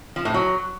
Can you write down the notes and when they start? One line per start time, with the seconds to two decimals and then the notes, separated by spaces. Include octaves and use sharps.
0.16 F3
0.25 A2
0.34 F#3